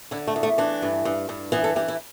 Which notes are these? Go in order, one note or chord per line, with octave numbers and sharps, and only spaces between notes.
D3 E4
A3
E2
A3
E3 D4
G2
G2
G2
E3 B3
A4
E3 G4
E4